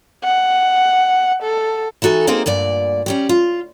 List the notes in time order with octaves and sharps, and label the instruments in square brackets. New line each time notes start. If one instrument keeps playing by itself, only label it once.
[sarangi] F#5
A4
[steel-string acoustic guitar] E3 D#4 F#4 A4 G#5
A#3 C4 D#4 G#4 C5
D2 G2 A#2 D5
G3 C#4 G4
F4